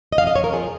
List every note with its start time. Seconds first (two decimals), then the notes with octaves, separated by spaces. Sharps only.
0.12 D#5
0.18 F2 F5
0.27 D#5
0.36 F2 C#5
0.44 A#4
0.53 F3 G#4